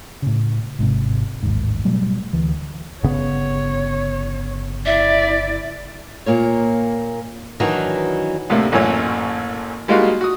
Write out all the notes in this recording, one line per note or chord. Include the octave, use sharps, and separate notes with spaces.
A2 C#3
G#1 G#2 C3
A1 D#2 G#2
B2 F#3 G3 A3
D2 E3
G1 C#3 B3 C#5
E4 D5 E5
A#2 A#3 C#5
D#3 E3 F#3 D4 D#4 F#4
D2 A2 C3 A3 A#3
A1 F#2 A#2 E3 A3 C#5
G3 G#3 A#3 D#4 F4 F#4
F#4 D#6